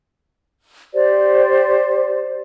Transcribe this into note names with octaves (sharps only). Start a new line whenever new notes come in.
G4 C5 D5